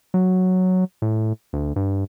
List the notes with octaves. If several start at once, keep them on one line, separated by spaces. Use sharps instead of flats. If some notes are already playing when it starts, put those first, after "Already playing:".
F#3
A2
D2
G2